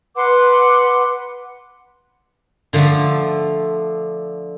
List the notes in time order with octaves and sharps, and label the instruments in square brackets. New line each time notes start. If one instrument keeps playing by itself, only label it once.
[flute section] B4 F#5 C6 D6
[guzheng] D3 F3 A3